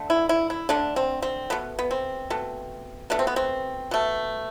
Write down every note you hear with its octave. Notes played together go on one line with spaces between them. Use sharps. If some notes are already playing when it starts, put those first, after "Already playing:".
Already playing: D3 A3
E4
E4
E4
D3 A3 D4
C4
C4
B2 A3 B3
B3
C4
B2 A3
B2 A3 D4
C4
B3
C4
B2 A3